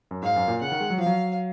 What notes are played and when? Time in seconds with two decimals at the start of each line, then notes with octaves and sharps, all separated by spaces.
0.11 F#2
0.22 G#2 F5
0.36 F#2
0.48 A#2
0.61 C#3 F#5
0.72 D#3
0.80 G#3
0.90 F#3
0.98 F3 F5
1.06 F#3